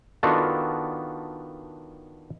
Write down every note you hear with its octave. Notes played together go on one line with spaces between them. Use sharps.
D#3 B3 D4 F4 F#4 A4